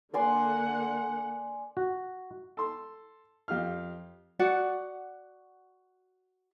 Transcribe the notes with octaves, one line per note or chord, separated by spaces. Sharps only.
D3 A#3 D5 F#5 G#5 C6
F#4
A4 C6
F2 G4 F5 F6
F#4 D5 F#5